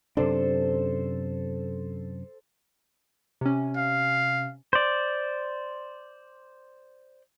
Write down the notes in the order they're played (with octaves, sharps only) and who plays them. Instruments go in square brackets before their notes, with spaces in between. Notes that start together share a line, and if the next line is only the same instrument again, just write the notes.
[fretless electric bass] F#2 C3 D4 [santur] A4 C5
[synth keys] C3 C#4
[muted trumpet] F5
[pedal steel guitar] C5 D5